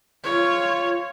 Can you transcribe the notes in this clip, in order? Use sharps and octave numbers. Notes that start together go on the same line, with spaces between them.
F4 C#5